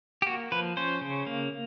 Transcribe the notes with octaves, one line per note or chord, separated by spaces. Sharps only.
G4
A#3 F#4
F3 B4
C#4 C5
C#3
A#3